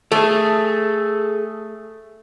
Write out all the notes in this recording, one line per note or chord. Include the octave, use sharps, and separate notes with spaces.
A3 G#4 A4